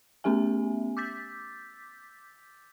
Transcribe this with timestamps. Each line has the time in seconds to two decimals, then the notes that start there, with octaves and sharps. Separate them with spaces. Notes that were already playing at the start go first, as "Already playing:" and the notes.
0.24 A3 B3 C#4 G4 E5 G#5
0.97 D6 E6 G6 A6 B6